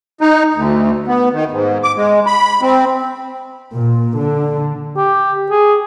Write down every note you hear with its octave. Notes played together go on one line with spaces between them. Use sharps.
D#4
D2
B3
D#3
G#2
D6
G#3
B5
C4
A#2
D3
G4
G#4